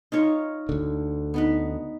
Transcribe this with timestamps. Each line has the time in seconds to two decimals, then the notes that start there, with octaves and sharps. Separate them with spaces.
0.12 D#4 F4 C#5
0.69 D2 D3
1.34 B3 D#4 B4